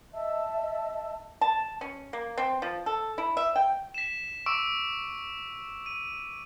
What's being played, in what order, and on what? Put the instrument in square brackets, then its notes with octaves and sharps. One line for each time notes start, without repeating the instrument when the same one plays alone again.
[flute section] D#5 E5 A5 E6
[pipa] A5
C#4
A#3
C4
F3
A4
E4
E5
G5
[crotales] B6 E7
C#6 D6 E6 D7
D#7